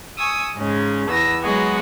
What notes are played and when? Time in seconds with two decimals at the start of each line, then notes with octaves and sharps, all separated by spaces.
0.18 G#5 C#6 D#6 E6
0.56 G#2 C#3 G#3 C#4
1.08 E2 B3 E6 A#6
1.42 F#3 G#3 B3 F#4 G#4